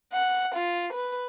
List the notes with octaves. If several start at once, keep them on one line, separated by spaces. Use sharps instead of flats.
F#5
F4
B4